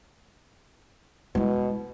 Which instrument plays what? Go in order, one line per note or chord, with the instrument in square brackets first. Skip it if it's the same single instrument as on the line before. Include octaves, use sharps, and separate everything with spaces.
[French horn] B2 [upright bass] G#3 E4